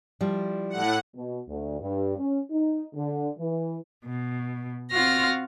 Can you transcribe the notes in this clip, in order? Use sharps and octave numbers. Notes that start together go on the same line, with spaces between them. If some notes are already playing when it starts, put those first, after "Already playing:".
F3 G3 E4
A2 F#5
B2
D2
G2
C#4
D#4
D3
E3
B2
C4 F4 F#4 F5 F6 A#6